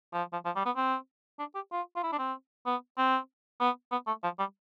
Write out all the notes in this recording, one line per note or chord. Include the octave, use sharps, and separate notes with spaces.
F3
F3
F3
G3
B3
C4
D4
G4
F4
F4
E4
D4
C4
B3
C4
B3
B3
A3
F3
G3